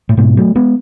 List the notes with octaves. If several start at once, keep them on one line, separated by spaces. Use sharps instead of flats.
A2
G#2 B2
F#3 A3
G#3 B3